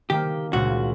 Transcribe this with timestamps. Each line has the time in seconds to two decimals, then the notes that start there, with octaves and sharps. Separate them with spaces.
0.10 D#3 A#3 G4
0.53 C#2 A#2 F#4